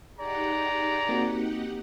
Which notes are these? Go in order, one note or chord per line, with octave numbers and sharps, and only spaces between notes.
D#4 G4 G#4 D5 F#5 A#5
A#3 C4 F#4